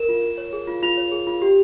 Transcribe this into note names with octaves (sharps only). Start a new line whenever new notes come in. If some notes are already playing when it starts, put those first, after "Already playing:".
Already playing: A#4 E7
F4
F4
C#5
G#4
F4
F4 F7
C#5
G#4
F4
G4